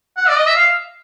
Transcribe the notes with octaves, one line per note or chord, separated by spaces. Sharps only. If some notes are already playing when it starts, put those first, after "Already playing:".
F#5
D5
D#5
E5
F5